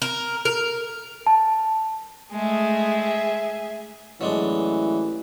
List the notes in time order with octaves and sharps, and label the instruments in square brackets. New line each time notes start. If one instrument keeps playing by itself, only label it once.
[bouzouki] A#4
A#4
[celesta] A5
[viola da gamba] G#3 A3 [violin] G#4 E5
[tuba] A1 [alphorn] E3 [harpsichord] F#3 G#3 D4